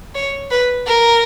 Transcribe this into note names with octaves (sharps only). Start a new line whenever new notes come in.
C#5
B4
A#4